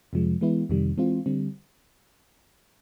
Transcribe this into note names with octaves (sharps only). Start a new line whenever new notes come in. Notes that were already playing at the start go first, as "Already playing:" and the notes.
F2 C3 F3 G#3
E3 G#3 B3 E4
F2 C3 D#3 G3
E3 G#3 C4 F4
D3 G3 C4